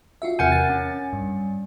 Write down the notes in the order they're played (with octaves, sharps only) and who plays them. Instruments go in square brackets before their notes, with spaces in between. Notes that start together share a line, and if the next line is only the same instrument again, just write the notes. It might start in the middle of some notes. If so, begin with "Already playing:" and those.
[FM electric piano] F4 F#4 E5
[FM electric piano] E2 C3 G6 [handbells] A#4 F#5 G#5
[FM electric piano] A6
[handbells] C#4
[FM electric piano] G2